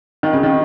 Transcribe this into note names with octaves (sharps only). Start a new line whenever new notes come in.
D#3
C#3
D#3